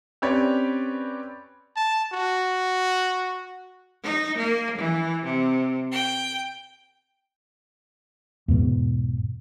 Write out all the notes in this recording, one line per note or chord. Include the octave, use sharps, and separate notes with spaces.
C4 C#4 G4 B4 C#5 D5
A5
F#4
D#4
A#3
E3
C3
G5
E2 G#2 B2